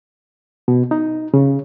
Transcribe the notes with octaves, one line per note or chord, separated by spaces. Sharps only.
B2
D#4
C#3